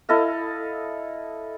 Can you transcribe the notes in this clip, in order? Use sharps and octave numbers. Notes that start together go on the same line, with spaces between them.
E4 A4 D#5 F5